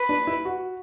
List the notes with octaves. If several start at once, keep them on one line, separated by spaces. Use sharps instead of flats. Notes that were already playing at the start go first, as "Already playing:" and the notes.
Already playing: B4
D4
E4
F#4